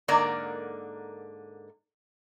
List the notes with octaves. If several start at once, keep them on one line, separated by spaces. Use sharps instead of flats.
G#2 D3 A#3 A#4 D5 A#5